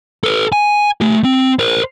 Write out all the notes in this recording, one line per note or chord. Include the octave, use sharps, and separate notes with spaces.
A4 B4
G#5
A3 G4
C4
A#4 C5